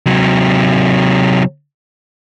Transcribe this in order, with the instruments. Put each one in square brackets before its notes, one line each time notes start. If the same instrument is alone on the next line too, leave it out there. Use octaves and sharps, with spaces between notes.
[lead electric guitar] C3 F#3